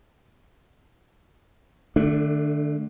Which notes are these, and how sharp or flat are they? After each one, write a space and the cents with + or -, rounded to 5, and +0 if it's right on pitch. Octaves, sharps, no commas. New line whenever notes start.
D3 +40 A3 +0 D4 +0